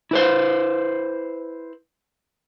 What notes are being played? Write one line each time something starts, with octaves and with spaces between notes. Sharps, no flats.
E4 B4 C5